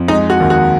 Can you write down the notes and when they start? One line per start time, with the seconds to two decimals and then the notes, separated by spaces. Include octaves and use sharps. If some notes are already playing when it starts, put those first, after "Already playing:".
Already playing: F2
0.08 G#3 D#4
0.30 F#4
0.41 D#2
0.50 F#4